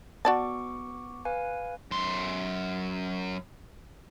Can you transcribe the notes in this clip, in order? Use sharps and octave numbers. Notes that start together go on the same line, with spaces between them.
B3 F#4 D5 A5 C#6 D6
B4 F5 G#5
F#2 C6